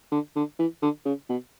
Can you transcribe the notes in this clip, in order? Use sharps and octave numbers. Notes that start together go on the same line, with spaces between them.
D3
D3
E3
D3
C#3
B2